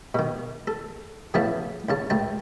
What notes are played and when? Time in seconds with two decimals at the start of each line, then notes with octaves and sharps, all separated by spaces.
0.14 B2 D#3
0.67 A4
1.34 A2 C#3 F3 B3 E4 A5
1.89 D#2 C#3 A5
2.10 C#2 A2 G5 A5